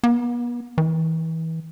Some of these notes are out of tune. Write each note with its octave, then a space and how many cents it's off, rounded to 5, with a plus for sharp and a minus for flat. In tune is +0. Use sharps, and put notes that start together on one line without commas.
B3 -40
E3 -30